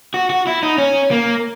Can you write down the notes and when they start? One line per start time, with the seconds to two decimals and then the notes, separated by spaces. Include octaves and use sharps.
0.14 F#4
0.30 F#4
0.47 E4
0.63 D#4
0.78 C#4
1.11 A#3